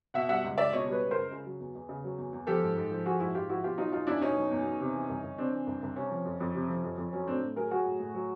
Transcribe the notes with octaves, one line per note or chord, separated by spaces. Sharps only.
B2 E5 F#5
G3 E5 F#5
C#2
C#2 D5 E5
B2 C#5 D#5
G3
B4 C#5
C#2
A#4 C5
C#2
C#3
F#3
E2
E2
C#3
F#3
E2
E2
F3 G4 A4
G#2
G#2
F3
F3 F#4 G#4
G#2 E4 F#4
G#2 F4 G4
F3 E4 F#4
B2 F4 G4
F#3 D#4 F4
E2 D#4 F4
E2 D4 E4
B2 C#4 D#4
F#3
E2
E2
C3
E3
C2
C2
C3 C4 D4
E3
C2
C2
C3 C#4
F3
F2
F2
C3
F3
F2
F2
F#3 C#4
A2 C4 D4
A2
F#3 G#4 A#4
F#3 F#4 G#4
A2
A2
F#3